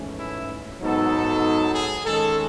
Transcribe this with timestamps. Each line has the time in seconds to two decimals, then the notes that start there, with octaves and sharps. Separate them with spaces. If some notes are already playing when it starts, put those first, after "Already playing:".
Already playing: G#2 E3 A3 C#4
0.19 E4
0.81 G#2 F#3 B3 D#4 A4
1.75 G#4
2.05 D#3 G#3 C#4 A4